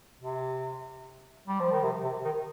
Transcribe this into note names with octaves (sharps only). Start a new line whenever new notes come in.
C3
G3
F3
D#3
C3
C3
D#3